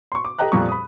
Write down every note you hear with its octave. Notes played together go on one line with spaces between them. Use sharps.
C6 C#6
D6
G4 A4 D#5 G5 A#5 F#6
F2 A#2 G3 A#5 C#6 D#6
B5 D#6